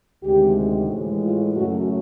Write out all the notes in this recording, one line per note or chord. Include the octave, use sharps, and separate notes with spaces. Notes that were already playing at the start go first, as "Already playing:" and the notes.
D2 C3 D#3 G#3 G4
A2 E3 G#3
F4
F#2 C#3 F#3 A3 F#4